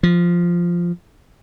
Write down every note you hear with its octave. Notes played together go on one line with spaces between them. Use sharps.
F3